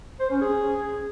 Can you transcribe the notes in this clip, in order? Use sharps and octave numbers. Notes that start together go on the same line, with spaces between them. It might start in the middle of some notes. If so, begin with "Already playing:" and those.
C5
C#4
G#4